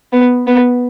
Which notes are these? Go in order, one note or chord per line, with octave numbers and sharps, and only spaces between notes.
B3
B3